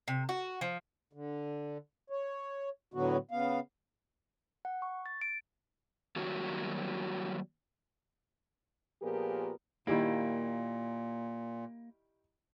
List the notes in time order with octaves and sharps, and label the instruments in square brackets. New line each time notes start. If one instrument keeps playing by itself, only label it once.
[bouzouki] C3
F#4
F3
[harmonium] D3
C#5
A2 D3 F#3 B3 F#4
C#3 B3 F5
[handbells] F#5
C#6
A6
D7
[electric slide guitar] D#3 F#3 G3 A#3 F#4 C#5
[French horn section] A#2 F3 B3 G4 G#4 A#4
[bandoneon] A#2 [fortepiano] D#3 G3 E4 [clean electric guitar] A#3